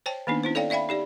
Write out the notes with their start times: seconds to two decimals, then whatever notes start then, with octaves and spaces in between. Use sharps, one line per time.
0.06 C5 C#5 G5 A5
0.27 D#3 A#3 B3 D4 D#4
0.43 C#4 E4 C5
0.55 A4 C#5 D5 F5 G5
0.70 D5 E5 F5 G5 B5
0.89 D#4 G4 D5